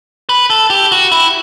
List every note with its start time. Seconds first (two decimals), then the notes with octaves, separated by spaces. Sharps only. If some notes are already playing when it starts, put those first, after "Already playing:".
0.29 B4
0.50 A4
0.70 G4
0.92 F#4
1.12 E4